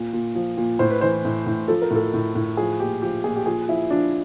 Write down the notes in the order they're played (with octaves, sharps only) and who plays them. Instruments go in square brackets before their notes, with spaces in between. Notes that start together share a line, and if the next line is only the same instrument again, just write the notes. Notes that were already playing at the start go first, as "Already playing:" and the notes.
Already playing: [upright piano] A#2
A#2
F3
A#2
A2 C5
B4
E3 C5
A2
A2
F3 A4
A#4
A2 A4
A2
A2
F3 G#4
A#2 G4
F3 G4
A#2 G#4
G4
F3 G#4
F3 E4
F3 D4